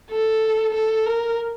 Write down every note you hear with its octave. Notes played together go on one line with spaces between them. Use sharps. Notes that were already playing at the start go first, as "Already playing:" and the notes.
A4
A4
A#4